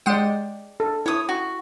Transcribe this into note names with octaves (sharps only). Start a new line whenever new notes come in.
G#3 D5 F#5 G5
A4
E4 C#5 D#6
F#4